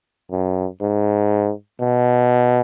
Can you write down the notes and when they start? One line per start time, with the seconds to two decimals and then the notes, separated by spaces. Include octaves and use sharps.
0.31 F#2
0.81 G#2
1.81 B2